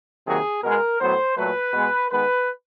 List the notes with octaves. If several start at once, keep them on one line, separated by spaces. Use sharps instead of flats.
C3 D#3 F#3 A#3 G#4
B2 G#3 B3 A#4
A2 F#3 B3 C5
A#2 F#3 A3 B4
B2 G#3 B3
D#3 G#3 B3 B4